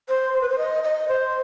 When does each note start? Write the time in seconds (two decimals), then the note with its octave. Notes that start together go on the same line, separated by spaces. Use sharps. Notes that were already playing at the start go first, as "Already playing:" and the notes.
0.08 C5
0.33 C5
0.41 B4
0.49 C5
0.58 D#5
0.84 D#5
1.08 C5